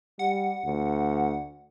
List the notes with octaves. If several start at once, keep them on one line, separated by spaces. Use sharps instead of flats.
G3 F#5
D2